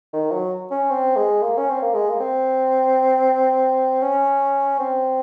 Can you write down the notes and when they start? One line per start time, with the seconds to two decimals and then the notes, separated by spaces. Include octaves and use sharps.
0.13 D#3
0.32 F#3
0.71 C#4
0.90 C4
1.16 G#3
1.42 A#3
1.57 C#4
1.69 C4
1.82 A#3
1.94 G#3
2.09 A#3
2.20 C4
4.02 C#4
4.79 C4